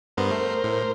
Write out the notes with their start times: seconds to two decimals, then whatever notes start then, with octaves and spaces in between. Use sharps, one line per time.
0.17 G2 B3 A#4 C5
0.31 A3
0.64 A2